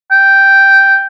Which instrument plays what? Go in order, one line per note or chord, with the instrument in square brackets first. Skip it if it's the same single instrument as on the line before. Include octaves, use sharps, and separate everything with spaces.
[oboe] G5